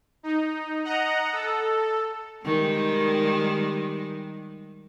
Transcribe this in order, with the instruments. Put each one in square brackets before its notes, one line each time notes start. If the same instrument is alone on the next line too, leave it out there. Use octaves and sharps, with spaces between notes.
[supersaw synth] D#4
D#5 F#5 A#5
A4
[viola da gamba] D#3 G3 G#3